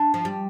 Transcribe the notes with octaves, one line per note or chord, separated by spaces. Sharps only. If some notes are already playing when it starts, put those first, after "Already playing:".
Already playing: D4
F3
G3